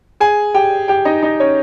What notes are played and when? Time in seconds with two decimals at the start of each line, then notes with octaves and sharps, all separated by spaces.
0.20 G#4 G#5
0.54 G4 G5
0.88 G4 G5
1.05 D#4 D#5
1.23 D#4 D#5
1.40 C#4 C#5